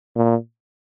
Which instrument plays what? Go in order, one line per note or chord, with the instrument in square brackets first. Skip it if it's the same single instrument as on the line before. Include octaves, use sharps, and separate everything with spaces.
[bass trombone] A#2